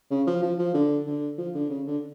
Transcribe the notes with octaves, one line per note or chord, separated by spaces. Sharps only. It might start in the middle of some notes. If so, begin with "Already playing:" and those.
C#3
F3
F3
F3
D3
D3
F3
D3
C#3
D3